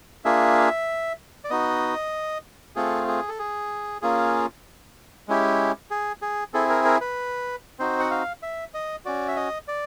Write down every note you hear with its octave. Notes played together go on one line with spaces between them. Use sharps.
A#3 D4 F4 G#4 E5
D5
B3 D#4 F#4 D#5
A3 C4 F4 G#4 A4
G#4
A4
G#4
A#3 C#4 F4 G#4
G#3 C#4 E4 G4
G#4
G#4
C4 E4 G#4 A4
A#4
A#4
B4
C4 D#4 F#4 C5
F#5
F5
E5
D#5
C#4 F#4 D5
E5
D#5
D5